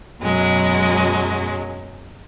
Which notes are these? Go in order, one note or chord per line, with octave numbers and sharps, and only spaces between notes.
F#2 B2 F#3 G#3